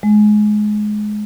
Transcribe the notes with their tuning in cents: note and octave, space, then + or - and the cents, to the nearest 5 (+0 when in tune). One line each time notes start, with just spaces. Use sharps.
G#3 +20